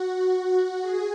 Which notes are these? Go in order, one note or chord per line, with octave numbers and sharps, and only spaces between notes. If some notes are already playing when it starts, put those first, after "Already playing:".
Already playing: F#4
G#4